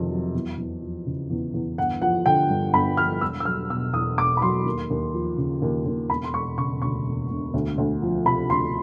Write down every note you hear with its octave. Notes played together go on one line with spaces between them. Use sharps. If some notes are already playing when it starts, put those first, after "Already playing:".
Already playing: F2 C3 D#3
F#3
E2
E2
F3
C#3
E2
E2
G1 F#5
F3 F#5
D3 G5
G2
G1 B5
F3 F6
E1 E6
E6
F#3 F6
B2 E6
E2 D#6
E1 D6
B5
F#3 C6
D#2
D#2
F3
C#3
D#2
D#2
E1 B5
C6
E1 C#6
C#3 C#6
D2 C#6
E1
E1
D2
D2
F3
C3 B5
D2 C6